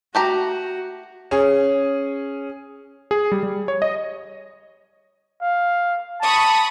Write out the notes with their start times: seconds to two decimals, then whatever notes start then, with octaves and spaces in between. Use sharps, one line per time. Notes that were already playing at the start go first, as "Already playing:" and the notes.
0.15 A3 F#4 G4 A#5
1.31 C#4 G#4
3.11 G#4
3.32 G3
3.43 G3
3.68 C#5
3.82 D#5
5.42 F5
6.21 A5 B5 C#6 D#6